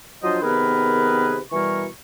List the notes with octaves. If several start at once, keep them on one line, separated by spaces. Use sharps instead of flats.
F3 F#3 D4 F4 C5 D#5
C3 D#3 B3 G#4 A#4 B4
B2 E3 G3 E4 A#4 C#6